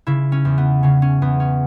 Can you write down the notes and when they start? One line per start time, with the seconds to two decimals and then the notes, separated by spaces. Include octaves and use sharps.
0.07 C#3 E4
0.32 C#4
0.45 E2
0.58 B3
0.83 C#3 C#4
1.02 C#4
1.22 E2 B3
1.40 C#4